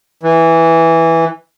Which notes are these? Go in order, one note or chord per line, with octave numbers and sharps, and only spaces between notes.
E3